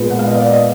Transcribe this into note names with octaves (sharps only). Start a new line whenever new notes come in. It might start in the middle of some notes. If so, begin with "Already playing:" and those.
Already playing: A#2 G#3 B3 B4
F#5
F5
D#5
D5
D#5